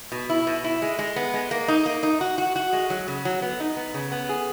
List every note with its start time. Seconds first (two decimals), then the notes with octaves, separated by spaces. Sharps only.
0.12 B2
0.30 E4
0.47 B2
0.64 E4
0.82 G#3
0.99 G#3
1.16 B3
1.34 G#3
1.51 A#3
1.68 D#4
1.86 A#3
2.03 D#4
2.21 F#4
2.38 F#4
2.56 F#4
2.73 G#3
2.90 F#3
3.08 C#3
3.25 F#3
3.42 B3
3.60 D#4
3.77 B3
3.94 C#3
4.12 B3
4.29 G#4